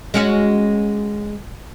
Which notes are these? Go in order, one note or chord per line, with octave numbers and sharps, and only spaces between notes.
G#3 C#4 F#4